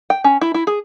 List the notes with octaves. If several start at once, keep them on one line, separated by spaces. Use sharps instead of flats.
G5
C#4
E4
E4
G#4